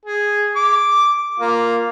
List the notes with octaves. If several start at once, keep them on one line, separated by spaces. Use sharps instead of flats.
G#4
D6
A#3 F4